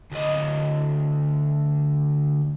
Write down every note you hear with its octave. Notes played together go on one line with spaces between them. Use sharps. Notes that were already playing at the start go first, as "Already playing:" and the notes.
D2 D#5